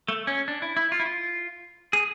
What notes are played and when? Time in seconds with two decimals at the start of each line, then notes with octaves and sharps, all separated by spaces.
0.08 A3
0.27 C#4
0.48 D4
0.62 E4
0.77 E4
0.92 F4
1.00 E4
1.05 F4
1.93 G#4